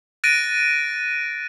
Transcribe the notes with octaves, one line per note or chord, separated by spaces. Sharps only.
F#6 A6 A#6 D7 D#7